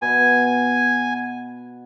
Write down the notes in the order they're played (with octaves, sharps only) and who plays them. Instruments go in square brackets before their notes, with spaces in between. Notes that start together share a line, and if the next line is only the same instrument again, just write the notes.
[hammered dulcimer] B2 [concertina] G#5